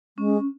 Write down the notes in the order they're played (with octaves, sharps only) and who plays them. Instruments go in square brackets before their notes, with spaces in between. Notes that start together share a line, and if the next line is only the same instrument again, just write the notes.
[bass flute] G#3 [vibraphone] C#4